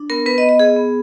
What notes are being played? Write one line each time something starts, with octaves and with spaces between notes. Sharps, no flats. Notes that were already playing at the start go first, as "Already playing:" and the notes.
Already playing: D4
B3 A#4
B3 B4
D#5
B3
D#5
B3 G#4
B3